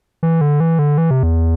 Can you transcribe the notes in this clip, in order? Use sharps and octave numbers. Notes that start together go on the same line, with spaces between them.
E3
D3
E3
D3
E3
C3
E2